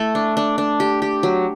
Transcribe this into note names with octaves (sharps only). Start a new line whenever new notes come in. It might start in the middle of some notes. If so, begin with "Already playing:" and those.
Already playing: A3 E4 A4
D4
D4
D4
G4
G4
F#3